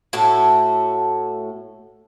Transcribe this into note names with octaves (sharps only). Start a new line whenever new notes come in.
A2 A3 F#4 A4